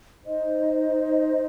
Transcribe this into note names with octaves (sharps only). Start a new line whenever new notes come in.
D#4 C5 D#5